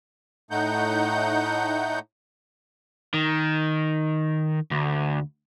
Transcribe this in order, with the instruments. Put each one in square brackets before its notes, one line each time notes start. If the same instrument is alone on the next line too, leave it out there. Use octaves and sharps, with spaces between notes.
[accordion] A2 A3 D#4 F#5 G6
[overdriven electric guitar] D#3
D2